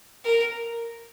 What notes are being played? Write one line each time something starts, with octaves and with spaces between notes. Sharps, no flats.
A#4